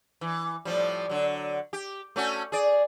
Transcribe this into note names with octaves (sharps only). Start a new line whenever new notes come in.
E3
A2 F3 G3
D3 F#3
G4
A3 C#4 F#4
G#4 D5